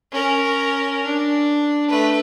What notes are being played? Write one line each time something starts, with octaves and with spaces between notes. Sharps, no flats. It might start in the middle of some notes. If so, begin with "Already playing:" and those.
C#4 A#4
D4
A3 B4